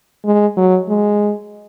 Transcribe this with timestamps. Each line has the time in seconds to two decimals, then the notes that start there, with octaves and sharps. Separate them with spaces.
0.25 G#3
0.57 F#3
0.89 G#3